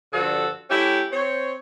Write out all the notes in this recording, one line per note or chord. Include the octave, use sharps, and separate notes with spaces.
G2 D3 F3 F#4 A4
A3 C#4 E4 G4
C4 C#5